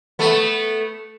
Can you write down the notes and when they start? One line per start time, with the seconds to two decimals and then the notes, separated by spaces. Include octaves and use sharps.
0.19 A3 B3